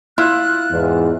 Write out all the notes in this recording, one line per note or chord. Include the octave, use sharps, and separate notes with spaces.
E4 F4 F#6
E2 G#2